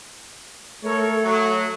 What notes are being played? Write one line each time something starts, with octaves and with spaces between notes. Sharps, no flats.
A3 A4 A#4 C#5
F#3